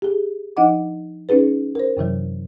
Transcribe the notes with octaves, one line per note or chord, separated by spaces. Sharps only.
G4 G#4
F3 D4 D#4 D#5 F#5 D6
C#4 D#4 G#4 B4
A#4 C5
F#2 C3 E3 F#3